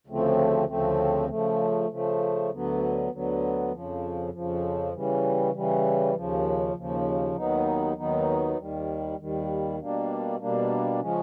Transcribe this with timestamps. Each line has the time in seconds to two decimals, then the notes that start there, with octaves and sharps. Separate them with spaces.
0.07 D2 C#3 F3 A3 C4
0.68 D2 C#3 F3 A3 C4
1.29 C#3 F3 A3
1.90 C#3 F3 A3
2.50 D2 D3 F#3 B3
3.11 D2 D3 F#3 B3
3.71 F2 C#3 F3
4.32 F2 C#3 F3
4.93 C#3 E3 G3
5.53 C#3 E3 G3
6.15 D#2 C#3 F3
6.75 D#2 C#3 F3
7.36 D#2 D#3 F#3 B3 D#4
7.96 D#2 D#3 F#3 B3 D#4
8.57 D#2 D#3 G3
9.18 D#2 D#3 G3
9.79 B2 G3 A#3 D4
10.40 B2 G3 A#3 D4
11.00 C#3 F3 G#3 C#4